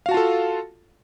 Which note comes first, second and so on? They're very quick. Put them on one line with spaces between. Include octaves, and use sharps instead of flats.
F5 F#4 A5 F4 A4